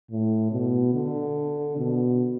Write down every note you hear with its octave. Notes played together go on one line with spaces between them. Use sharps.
A2
B2
D3
B2